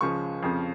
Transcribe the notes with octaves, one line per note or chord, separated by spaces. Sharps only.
C#2 C#3 F3 G#3 C#6
F2 C#3 F3